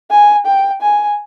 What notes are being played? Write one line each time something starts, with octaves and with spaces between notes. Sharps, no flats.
G#5
G5
G#5